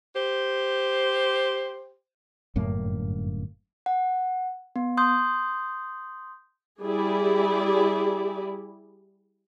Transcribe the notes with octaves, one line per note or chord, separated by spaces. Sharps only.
G4 C5
G1 F#2 A2 A#3
F#5
B3
C6 D#6 G6
G3 E4 G4 G#4 D5